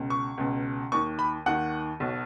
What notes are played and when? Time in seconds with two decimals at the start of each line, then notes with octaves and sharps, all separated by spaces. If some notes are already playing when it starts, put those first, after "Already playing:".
Already playing: C#2 B2
0.10 C#6
0.38 C#2 B2
0.92 D#2 D#3 C#6
1.19 B5
1.46 D#2 D#3 F#5
2.00 B1 B2